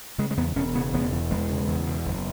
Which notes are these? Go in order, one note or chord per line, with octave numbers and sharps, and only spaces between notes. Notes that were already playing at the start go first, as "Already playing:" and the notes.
C#3 G#3
G#3
E2 B3
E1 C#4
C#3 B3
E1 B3
E2
E1 G#3
C#3
E2
B2
F#1